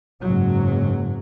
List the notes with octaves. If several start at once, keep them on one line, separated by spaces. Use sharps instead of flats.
F#1 G#2 F#3